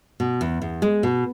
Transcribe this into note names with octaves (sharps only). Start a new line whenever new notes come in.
B2
E2
E2
G#3
B2